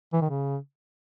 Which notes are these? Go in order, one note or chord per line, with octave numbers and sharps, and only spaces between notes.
E3
D#3
C#3